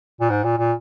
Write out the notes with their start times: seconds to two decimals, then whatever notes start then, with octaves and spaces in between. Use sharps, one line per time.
0.20 A#2
0.30 G#2
0.43 A#2
0.58 A#2